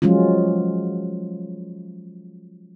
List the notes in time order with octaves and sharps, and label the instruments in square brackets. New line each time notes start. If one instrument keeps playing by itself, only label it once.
[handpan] F3 F#3 G#3 C#4 F4